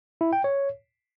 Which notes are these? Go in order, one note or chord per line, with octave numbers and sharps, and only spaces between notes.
E4
G5
C#5